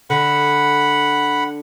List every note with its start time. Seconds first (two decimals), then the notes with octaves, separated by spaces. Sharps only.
0.10 D3 F#5 B5